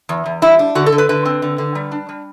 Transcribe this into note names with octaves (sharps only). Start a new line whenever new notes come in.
E2
E2
G3 E4
D4
D3 F#4
A4
D3
B4
D3 B4
C4
D3
D3
G3
D4
G3